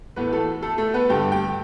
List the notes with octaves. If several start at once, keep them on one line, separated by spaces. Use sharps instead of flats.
A2 E3 A3 B3 B4
A3 A4
A3 A4
A3 A4
B3 B4
G2 D3 A3 G4 G5
G4 G5